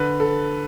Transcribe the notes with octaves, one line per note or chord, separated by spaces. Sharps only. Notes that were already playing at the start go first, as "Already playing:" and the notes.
Already playing: D3 B4
A4